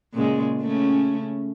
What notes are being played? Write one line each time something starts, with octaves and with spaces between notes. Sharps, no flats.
A#2 C#3 G#3
C#3 A3 C#4